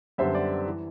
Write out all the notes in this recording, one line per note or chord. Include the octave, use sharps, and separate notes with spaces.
F#2 D3 G3 B3 C5 E5
D5
E3